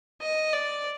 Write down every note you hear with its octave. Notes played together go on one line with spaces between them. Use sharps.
D#5
D5